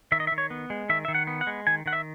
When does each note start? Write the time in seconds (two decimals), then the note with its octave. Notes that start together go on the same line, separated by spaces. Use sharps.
0.12 D#3 E5
0.20 D#5
0.27 E5
0.32 D#3
0.38 C#5
0.50 B3
0.70 G#3
0.89 D#3 E5
1.05 D#3 E5
1.14 F#5
1.27 B3
1.41 F#5
1.47 G#3
1.67 D#3 G#5
1.86 D#3 F#5
1.93 E5